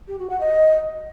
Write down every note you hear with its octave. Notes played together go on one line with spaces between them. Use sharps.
G4
F#4
F#5
D#5